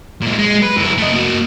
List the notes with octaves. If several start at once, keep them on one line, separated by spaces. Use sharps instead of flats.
A#2 G#3
G#3
B4
F#2 E4
A3 D#5
A#3 F#4